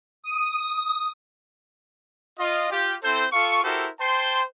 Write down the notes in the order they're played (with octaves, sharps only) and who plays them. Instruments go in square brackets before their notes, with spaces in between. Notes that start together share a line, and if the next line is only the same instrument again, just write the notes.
[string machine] D#6
[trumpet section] F4 D#5
F4 G4
C4 E4 A4 C5
F4 A4 F5 C#6
E4 F#4 G4 A4 A#4 C5
C5 G5 A5 C6